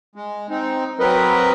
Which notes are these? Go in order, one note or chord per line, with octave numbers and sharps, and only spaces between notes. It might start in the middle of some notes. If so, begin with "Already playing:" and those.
G#3
C4 D#4
F#3 C4 A#4 B4 D#5